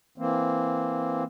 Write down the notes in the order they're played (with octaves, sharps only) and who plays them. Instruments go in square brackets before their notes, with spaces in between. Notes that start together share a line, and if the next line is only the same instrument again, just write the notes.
[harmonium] E3 A#3 C4